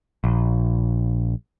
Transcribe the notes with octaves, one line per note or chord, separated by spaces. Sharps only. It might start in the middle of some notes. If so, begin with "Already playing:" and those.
A#1